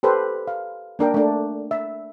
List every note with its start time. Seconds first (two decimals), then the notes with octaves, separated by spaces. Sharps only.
0.03 G4 A4 B4 C5
0.47 F5
0.99 A#3 D4 A#4 G5
1.14 A3 D4
1.71 E5